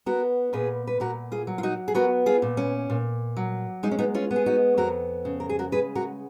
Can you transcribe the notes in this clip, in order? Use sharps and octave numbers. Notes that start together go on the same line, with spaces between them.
B3 F#4 A#4
A#2 G#4 B4
B4
A#2 F#4 A#4
F4 G#4
F#3
F4
D#4 F#4
G#4
B3 F#4 A#4
F4 G#4
A#2
C#4
A#2
F#3
G#3 D#4
C#4
B3 D#4
C#4 F4
B3
G#4
D#4 F#4
F2 F#4 A#4
C#3
A#4
G#4
F#4 A#4
G#3 G#4 B4
F#4 A#4